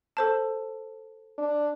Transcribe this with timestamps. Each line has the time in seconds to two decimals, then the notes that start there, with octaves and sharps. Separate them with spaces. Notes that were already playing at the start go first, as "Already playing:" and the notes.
0.17 A4 C5 A5
1.38 D4